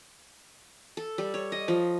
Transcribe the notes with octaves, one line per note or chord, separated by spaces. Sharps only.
A4
G3
C#5
D#5
F3